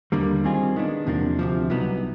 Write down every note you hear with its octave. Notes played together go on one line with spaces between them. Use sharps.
D#2 D3 G3 A#3
D#3 G3 C4 F4 G#4
D#3 G#3 B3 D4
E2 C3 F3 A#3 D4
D2 C3 F3
C2 B2 F#3 B3 D#4